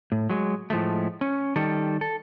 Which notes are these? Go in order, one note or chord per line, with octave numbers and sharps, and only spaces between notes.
A2
F#3 G#3
A2 F3 G#3 A3
C#4
D#3 G3 A4
A4